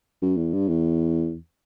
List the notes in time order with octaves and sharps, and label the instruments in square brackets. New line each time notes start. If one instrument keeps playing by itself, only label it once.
[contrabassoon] F#2
E2
G2
E2